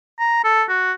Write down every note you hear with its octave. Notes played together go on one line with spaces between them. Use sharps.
A#5
A4
F#4